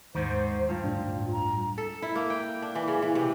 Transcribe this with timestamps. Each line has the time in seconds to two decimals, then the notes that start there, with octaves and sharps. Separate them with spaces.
0.15 D#2 G#2 D#3 C5
0.69 G2 F4
0.84 D2 A2 D4
1.32 A#5
1.78 A4
2.02 E4
2.15 A#3
2.30 G5
2.62 D4
2.75 E3
2.88 C#3
3.02 E3
3.15 C3